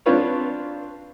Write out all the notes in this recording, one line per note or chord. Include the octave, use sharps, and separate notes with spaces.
C4 D4 F4 B4 C#5